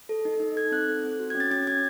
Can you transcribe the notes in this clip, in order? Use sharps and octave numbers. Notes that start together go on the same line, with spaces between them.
A4
D#4
D#4
A4 G#6
C4 F#6
A4
C4
F#4
C#4 G#6
A6
C#4 A6
C#4 G#6